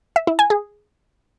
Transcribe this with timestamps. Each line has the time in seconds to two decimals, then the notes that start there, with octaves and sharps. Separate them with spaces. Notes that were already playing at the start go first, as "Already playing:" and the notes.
0.16 E5
0.27 E4
0.39 G#5
0.50 G#4